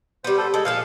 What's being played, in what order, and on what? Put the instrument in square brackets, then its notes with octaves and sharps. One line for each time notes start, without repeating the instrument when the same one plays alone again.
[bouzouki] G3 B3 [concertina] C5
[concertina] A4 C5
[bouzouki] G#3 [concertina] A4
[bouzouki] A#2 F3 A4 [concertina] F5